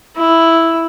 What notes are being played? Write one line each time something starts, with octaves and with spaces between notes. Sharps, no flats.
E4